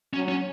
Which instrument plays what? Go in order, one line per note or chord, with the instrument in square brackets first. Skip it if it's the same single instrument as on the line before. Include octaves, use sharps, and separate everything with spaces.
[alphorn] F#3 [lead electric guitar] C#4
[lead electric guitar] C#4